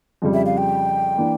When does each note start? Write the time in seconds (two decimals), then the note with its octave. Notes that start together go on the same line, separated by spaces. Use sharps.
0.22 F2 C#3 G3
0.34 E5
0.46 F5
0.58 G5
1.18 E3 A#3 D4